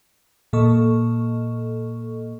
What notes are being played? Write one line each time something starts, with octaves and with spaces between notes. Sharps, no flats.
A#2 A#3 A4 D#5 C#6